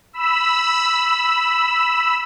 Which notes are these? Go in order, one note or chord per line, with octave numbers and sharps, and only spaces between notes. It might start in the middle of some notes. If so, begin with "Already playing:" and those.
B5 E6